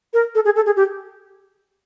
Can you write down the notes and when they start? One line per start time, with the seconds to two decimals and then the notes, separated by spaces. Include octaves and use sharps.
0.14 A#4
0.35 A4
0.45 G#4
0.56 A4
0.66 G#4
0.76 G4